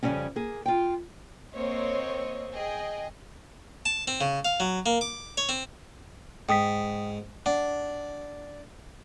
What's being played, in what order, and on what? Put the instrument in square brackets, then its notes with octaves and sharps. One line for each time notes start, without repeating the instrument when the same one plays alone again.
[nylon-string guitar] F2 C#3 F#3 G3 C4 C#4
A#3 G#4
F4 G5
[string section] A#3 C4 C5 C#5 D#5
G#4 D#5 G5
[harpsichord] A5
C4
C#3
F5
F#3
A#3
D6
C#5
C4
[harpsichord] G#2 [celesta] G5 D#6 B6
[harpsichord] D4 [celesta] F#5